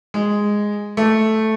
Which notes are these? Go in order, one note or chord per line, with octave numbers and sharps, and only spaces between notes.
G#3
A3